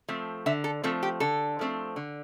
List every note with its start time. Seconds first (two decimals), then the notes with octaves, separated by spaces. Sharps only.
0.08 F3 A3 C4
0.46 D3 E5
0.64 A4
0.84 F3 A3 C4 A4
1.03 G4
1.20 D3 A4
1.59 F3 A3 C4
1.96 D3